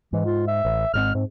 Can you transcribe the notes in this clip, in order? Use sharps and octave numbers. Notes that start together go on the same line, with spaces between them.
G#2 E3
F4
E5
A1
G#1 G#2 C4 F6
G#2 C4